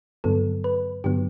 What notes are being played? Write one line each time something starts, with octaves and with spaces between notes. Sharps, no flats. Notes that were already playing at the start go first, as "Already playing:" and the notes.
G2 D3 F#3 B3 A4
B4
G2 D3 F#3 B3 G4